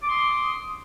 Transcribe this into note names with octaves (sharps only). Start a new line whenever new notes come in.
C6 D6 D#6